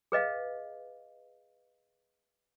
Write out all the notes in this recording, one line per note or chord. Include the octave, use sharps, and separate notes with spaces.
G#4 B4 D#5 F5